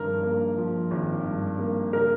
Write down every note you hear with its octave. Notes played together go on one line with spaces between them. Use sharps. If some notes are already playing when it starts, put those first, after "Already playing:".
Already playing: G#1 G2 F3 A#4
A#3
F3
G#1
G2
A#3
C#3 A#4